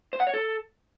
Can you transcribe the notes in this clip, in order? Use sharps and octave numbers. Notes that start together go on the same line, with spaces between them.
C5
F#5
C#5
A4